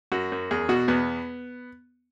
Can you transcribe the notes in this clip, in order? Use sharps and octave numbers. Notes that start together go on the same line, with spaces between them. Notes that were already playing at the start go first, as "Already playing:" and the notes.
F#2 F#4
F#2
E2 G#4
B2 F#4
E2 B3